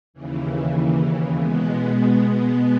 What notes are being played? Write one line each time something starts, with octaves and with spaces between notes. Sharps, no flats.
D#2 C#3 E3
B2 G#3 B3